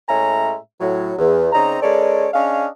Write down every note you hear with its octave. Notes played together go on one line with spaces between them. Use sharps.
A2 G#3 C#4 E5 G#5 A#5
A2 F#3
E2
C#3 C4 D#4 D5 A#5
G#3 C#4 A4 A#4 C#5 D5
C#4 D4 G#4 D#5 F5